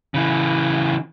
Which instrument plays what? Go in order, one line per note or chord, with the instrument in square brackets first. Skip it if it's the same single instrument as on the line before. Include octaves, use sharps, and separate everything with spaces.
[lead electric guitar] C#3 E3